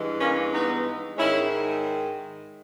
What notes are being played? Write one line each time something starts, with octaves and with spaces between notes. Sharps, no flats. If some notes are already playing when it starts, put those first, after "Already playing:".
Already playing: G2 E3 G#3
A#3 C#4
B3 D#4
G#2 D#3 G#3 C#4 E4